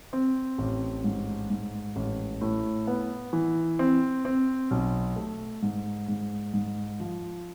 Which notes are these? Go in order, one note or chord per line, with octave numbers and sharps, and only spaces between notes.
C4
A1
G#2
G#2
A1
A2
B3
E3
C4
C4
B1
A3
G#2
G#2
G#2
F3